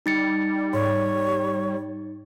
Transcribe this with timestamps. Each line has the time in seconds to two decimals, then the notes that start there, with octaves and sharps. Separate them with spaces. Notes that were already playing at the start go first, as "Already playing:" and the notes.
0.06 G3 D#4 A6 C#7
0.73 G#2 C#5